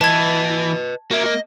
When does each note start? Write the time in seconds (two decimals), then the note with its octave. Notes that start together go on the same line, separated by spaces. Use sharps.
0.01 E3 B4 D#5 A5 G#6
1.11 A#3 F#4 E5
1.26 D#5